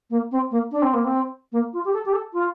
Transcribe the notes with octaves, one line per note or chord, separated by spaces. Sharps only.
A#3
C4
A#3
D4
C4
A#3
C4
A#3
F4
G4
A4
G4
A4
F4